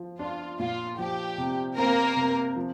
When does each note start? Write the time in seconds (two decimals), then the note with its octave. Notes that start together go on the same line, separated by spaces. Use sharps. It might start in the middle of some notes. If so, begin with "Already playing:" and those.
Already playing: F3
0.19 D4 F4
0.59 A#2 F4
0.98 F3 G4
1.38 C3
1.77 A#3 C4 A#4
2.17 C3
2.56 F3